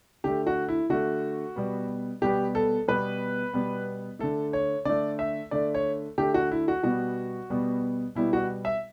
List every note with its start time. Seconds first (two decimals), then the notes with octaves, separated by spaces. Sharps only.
0.24 D3 A3 G4
0.47 F#4
0.69 E4
0.90 D3 A3 F#4
1.56 B2 G3 B3
2.21 B2 G3 B3 G4
2.55 A4
2.88 B2 G3 B3 B4
3.54 B2 G3 B3
4.19 D3 A3 A4
4.53 C#5
4.85 D3 A3 D5
5.19 E5
5.51 D3 A3 D5
5.74 C#5
6.18 D3 A3 G4
6.34 F#4
6.51 E4
6.68 F#4
6.83 B2 G3 B3 F#4
7.50 B2 G3 B3
8.15 B2 G3 B3 E4
8.33 F#4
8.65 E5